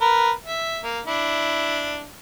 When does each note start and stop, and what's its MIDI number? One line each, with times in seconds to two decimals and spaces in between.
0.01 0.31 70
0.01 0.31 71
0.46 0.80 76
0.84 1.00 58
1.06 2.05 62
1.06 2.05 64